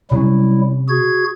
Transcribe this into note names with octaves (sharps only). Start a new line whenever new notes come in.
C3 F#3 G3 C#4 E4
F#4 G#4 G#6